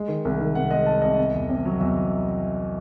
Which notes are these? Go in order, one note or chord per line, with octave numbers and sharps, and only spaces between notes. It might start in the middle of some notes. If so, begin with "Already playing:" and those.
Already playing: G#3
D#3
C2
D#3
C3 F#5
G#3 D#5
G#3 A5
C2 D#5
C3
E2
C3
F#3
E2 E5